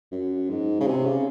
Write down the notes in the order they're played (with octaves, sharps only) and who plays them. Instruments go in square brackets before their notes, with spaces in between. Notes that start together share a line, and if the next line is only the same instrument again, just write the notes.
[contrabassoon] F#2
G#2
C#3
C3
C#3